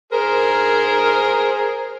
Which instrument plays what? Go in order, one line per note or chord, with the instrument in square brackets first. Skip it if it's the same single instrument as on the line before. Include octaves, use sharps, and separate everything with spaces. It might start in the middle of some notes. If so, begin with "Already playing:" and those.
[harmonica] G#4 C5 [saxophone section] A#4